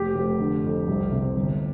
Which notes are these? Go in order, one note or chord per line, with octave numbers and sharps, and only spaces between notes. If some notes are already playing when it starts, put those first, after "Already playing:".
Already playing: F1 G4
F1
D3
F2
C2
C3
G1